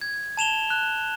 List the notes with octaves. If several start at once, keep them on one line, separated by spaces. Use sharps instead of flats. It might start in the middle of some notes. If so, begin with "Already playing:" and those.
G#6
A5 E7 F7 G7
F#6